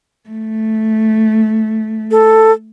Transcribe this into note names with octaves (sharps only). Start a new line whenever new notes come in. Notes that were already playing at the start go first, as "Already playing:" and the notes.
A3
A4